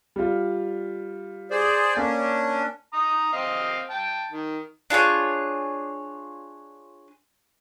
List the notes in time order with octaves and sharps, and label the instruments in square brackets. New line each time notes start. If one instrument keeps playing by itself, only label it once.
[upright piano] G3 F4
[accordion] G#4 C5 D5
[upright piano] A#3 [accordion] C#4 D4
[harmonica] A#5 D#6
C4 D#5 F5
G5 A5
D#3
[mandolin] D4 F4 G#4 C#5